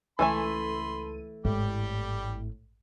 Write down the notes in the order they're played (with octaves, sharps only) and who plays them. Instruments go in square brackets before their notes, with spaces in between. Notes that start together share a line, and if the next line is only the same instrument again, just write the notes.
[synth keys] C#2 A4 D#7 [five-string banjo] E3 A3 G#5 [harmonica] B5 C6
[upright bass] G#1 [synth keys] A2 [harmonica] G3 G4